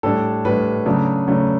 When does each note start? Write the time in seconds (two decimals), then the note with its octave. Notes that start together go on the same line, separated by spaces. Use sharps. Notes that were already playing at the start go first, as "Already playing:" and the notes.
0.03 A2 G3 D4 A4
0.45 A2 G3 D4 B4
0.86 C#3 F#3 A3 D4
1.28 C#3 F#3 A3 D4